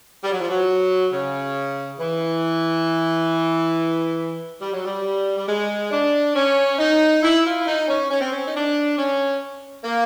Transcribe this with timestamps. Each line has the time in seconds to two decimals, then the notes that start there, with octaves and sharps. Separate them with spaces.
0.23 G3
0.32 F#3
0.40 F3
0.49 F#3
1.10 C#3
1.98 E3
4.60 G3
4.72 F#3
4.84 G3
5.36 G3
5.47 G#3
5.91 D4
6.34 C#4
6.78 D#4
7.22 E4
7.44 F4
7.57 E4
7.66 D#4
7.87 C#4
8.09 C#4
8.20 C4
8.30 C#4
8.45 D#4
8.53 D4
8.97 C#4
9.84 A#3